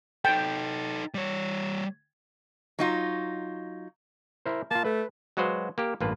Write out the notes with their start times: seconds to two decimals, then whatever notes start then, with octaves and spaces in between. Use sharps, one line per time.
0.25 D#4 A4 G5
1.14 G3 C#5
2.79 F#3 D#4 F4
4.46 E4 A#4 C5
4.71 A#3 F4 A5
4.84 A3 B4
5.37 F#3 G#3 F#4 B4 C5 F5
5.78 A#3 G4 A#4
6.00 A1 G2 A#3 F4 B4